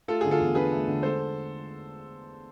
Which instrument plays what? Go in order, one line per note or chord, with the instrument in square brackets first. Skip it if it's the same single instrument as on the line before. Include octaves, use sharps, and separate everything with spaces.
[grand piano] A3 [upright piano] F4 A4
[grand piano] D3 [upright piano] G#4
[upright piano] F4 A4
[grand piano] E2
[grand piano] D4 [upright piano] G#4 B4
[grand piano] A3
D3
[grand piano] G#3 [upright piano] A4 C5